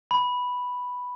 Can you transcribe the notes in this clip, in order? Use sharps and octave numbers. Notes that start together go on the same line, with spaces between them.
B5